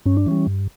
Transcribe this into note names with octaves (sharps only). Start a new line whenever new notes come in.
G2 C#4
D4
E3 G3 C#4
G2